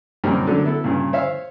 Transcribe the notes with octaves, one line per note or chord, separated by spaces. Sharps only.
F#2 C3 G3 A#3 C#4 D#4
D3 F#3 A3 D4
B3 E4 A4
G2 A#2 C#3
C5 C#5 E5 F5